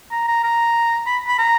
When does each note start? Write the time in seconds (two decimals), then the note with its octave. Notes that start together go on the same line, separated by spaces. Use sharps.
0.11 A#5
0.28 A#5
0.44 A#5
1.07 B5
1.27 B5
1.38 A#5